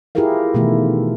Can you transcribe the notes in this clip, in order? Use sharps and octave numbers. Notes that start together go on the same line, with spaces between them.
E4 F4 G4 G#4 A#4 F5
B2 D#3 E3 A3 E4